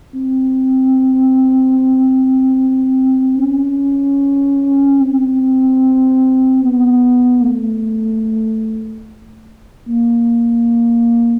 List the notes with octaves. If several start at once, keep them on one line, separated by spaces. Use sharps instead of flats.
C4
C#4
C4
B3
A3
A#3